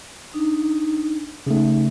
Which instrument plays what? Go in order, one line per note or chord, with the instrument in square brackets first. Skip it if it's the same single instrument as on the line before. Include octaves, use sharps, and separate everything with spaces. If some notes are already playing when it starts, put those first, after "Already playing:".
[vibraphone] D4 D#4
[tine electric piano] C#3 A3 [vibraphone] D#4